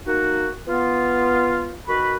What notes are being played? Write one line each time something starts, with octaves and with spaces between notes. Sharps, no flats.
A#3 D#4 F#4
B3 F4
D#3 F#4 A#4 B4 B5